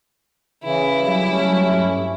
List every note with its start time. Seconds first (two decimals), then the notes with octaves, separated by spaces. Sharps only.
0.64 C#3 E3 E4
1.02 F#3 G3
1.31 A3 C#4
1.70 G2